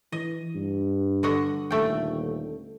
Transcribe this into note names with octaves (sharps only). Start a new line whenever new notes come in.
E3 D#5
G2
D3 F#4 D#5
D#1 A3 G5